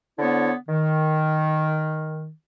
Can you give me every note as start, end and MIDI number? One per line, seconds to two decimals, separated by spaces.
0.19 0.52 50
0.19 0.52 59
0.19 0.52 64
0.19 0.52 72
0.19 0.52 73
0.69 2.28 51